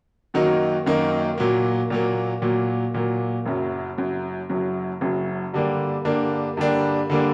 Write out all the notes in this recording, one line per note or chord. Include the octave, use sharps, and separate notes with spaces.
F#2 D#3 F#3 A#3 D#4
F#2 D#3 F#3 A#3 D#4
A#2 F#3 A#3
A#2 F#3 A#3
A#2 F#3 A#3
A#2 F#3 A#3
F#1 F#2 F#3
F#1 F#2 F#3
F#1 F#2 F#3
F#1 F#2 F#3
G2 D3 G3 A#3 D4
G2 D3 G3 A#3 D4
G2 D3 G3 A#3 D4
D3 G3 A#3 D4